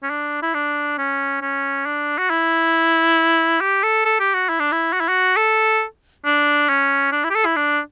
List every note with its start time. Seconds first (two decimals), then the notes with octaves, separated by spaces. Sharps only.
0.03 C#4
0.10 D4
0.42 E4
0.54 D4
0.98 C#4
1.41 C#4
1.85 D4
2.18 F#4
2.30 E4
3.61 G4
3.83 A4
4.05 A4
4.19 G4
4.34 F#4
4.49 E4
4.59 D4
4.72 E4
4.93 F#4
5.00 E4
5.08 F#4
5.36 A4
6.25 D4
6.69 C#4
7.12 D4
7.24 E4
7.30 G4
7.35 A4
7.45 E4
7.56 D4